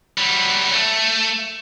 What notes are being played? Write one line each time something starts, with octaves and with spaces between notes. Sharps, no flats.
F#3 G3
A3